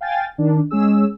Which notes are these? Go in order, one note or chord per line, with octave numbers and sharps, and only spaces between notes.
F5 G5 G#5 A6
D#3 D4
G#3 C#4 G#4 E6